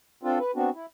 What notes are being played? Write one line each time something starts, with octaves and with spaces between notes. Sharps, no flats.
C4 D4 F4 A4
B4
B3 C4 D4 F#4
E4